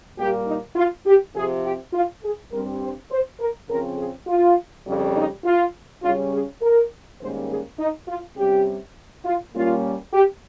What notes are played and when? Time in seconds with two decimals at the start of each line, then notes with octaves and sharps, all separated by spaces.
0.17 A#2 G3 A#3 G4
0.47 D#4
0.76 F4
1.05 G4
1.35 C3 F3 C4 G#4
1.64 G4
1.93 F4
2.23 G#4
2.51 G2 G3 C4 A#4
2.81 C5
3.10 C5
3.40 A#4
3.68 C#3 F3 C4 A#4
3.98 G#4
4.27 F4
4.86 F2 C#3 G3
5.15 D#4
5.44 F4
6.03 C#3 G3 C#4 F4
6.32 G#4
6.61 A#4
7.20 G#2 D#3 G3 A#3 C#4 C5
7.49 G#4
7.78 D#4
8.08 F4
8.36 C3 G3 C#4 G4
9.25 F4
9.54 A#2 G3 A#3 C#4 F4
10.12 G4